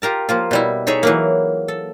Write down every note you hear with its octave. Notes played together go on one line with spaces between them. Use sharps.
F4 G4 A#4 A5
F3 A#3 F4
B2 G3 E4
D#4 G#4 A4 C#5 E5
E3 F#3 A#3
A4